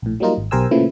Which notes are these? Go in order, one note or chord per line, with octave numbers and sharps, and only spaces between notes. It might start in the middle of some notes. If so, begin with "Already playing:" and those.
A#1 A2
F#3 G3 A#3 D#4 F4 A#4
G#1
B1 G4 A#4 C5 G#5 E6
A#2 C#3 E3 F3 A3 E4